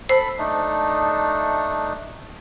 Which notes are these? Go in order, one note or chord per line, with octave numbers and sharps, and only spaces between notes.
A4 C5 B5
A3 D4 D#4